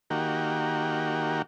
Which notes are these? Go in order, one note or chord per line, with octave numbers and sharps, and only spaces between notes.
D#3 A#3 F#4 G4